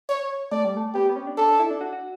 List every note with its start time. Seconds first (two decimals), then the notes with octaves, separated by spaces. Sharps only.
0.09 C#5
0.52 A3 D5
0.65 G3
0.77 A3
0.95 B3 G4
1.09 B3
1.16 C#4
1.27 D4
1.37 D4 A4
1.49 D4
1.60 E4
1.70 D4
1.81 F#4
1.93 F#4